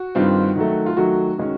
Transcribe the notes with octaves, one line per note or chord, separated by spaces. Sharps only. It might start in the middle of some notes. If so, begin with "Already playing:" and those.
Already playing: F#4
G2 D#3 G3 C4 F4
D#3 F#3 A3
F4
D#3 F#3 A3 F#4
D#3 G#3 C#4